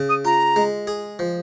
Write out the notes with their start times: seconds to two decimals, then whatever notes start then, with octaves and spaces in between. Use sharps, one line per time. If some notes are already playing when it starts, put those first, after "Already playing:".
Already playing: C#3
0.08 D#6
0.25 F4 A#5
0.56 G#3
0.87 G#4
1.19 F3